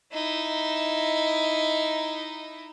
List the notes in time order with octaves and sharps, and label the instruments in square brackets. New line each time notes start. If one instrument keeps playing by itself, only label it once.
[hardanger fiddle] D#4 E4